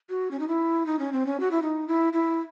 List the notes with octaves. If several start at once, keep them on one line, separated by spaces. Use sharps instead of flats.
F#4
C#4
D#4
E4
D#4
C#4
C4
C#4
F#4
E4
D#4
E4
E4